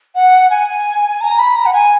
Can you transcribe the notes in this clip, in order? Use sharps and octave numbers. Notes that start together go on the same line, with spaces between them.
F#5
G#5
A#5
B5
A#5
F#5
G#5